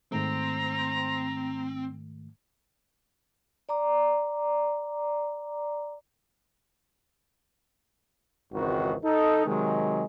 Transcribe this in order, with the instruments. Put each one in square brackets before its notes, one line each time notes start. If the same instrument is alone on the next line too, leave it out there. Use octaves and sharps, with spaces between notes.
[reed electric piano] G#2 D#3 A3 [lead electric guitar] C4 [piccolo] A#5
[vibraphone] D5 A#5 D6
[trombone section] G#1 C#2 D#3 E3 C4 F#4
D#4 A4
C3 D#3 F#3 G#3